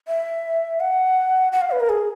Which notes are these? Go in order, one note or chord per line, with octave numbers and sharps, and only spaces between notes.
E5
F#5
F#5
F5
B4
A#4
G#4